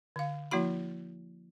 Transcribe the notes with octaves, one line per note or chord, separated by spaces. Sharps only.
D3 F5
F3 A#3 E4 F#4 B5